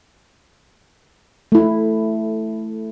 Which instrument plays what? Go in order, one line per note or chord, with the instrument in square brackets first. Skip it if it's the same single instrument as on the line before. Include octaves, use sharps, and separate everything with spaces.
[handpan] A3 E4